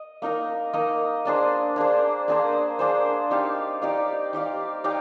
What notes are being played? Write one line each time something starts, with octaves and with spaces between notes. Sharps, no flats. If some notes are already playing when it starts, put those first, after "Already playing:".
Already playing: D#5
A#3 D#4 A#4 D#5
A#3 D#4 A#4 D#5
A#3 D4 G#4 C5
A#3 D4 G#4 C5
A#3 D4 G#4 C5
A#3 D4 G#4 C5
D#4 G4 D5 F5
D#4 G4 D5 F5
D#4 G4 D5 F5
D#4 G4 D5 F5